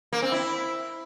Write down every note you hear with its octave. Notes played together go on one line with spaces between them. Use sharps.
A#3
C4
E4